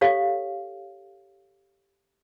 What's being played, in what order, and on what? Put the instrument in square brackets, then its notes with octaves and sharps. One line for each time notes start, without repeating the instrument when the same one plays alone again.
[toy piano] G4 A4 C#5 F5